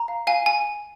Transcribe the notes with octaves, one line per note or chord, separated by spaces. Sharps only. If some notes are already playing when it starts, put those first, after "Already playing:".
Already playing: A#5
F5
F5 G#5
G#5